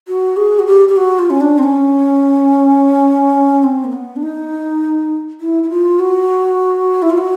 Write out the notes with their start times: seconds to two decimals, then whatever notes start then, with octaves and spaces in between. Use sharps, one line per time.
0.08 F#4
0.37 G#4
0.59 F#4
0.66 G4
0.88 G4
0.97 F#4
1.19 F4
1.30 C#4
1.41 D4
1.58 C4
1.63 C#4
3.63 C4
3.84 A#3
3.92 B3
4.16 D4
4.23 D#4
5.41 E4
5.63 E4
5.70 F4
5.99 F#4
7.02 E4
7.10 F4
7.18 F#4